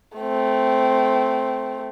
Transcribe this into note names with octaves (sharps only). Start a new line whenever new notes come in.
A3 C4